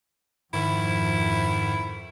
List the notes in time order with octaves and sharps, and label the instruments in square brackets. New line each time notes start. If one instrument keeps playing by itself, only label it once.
[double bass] F2 [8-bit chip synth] G#2 D#3 [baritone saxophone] E4